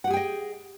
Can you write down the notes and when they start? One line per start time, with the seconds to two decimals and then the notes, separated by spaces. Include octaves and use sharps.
0.04 F#5
0.07 G4
0.10 G#4
0.14 G5
0.17 D#5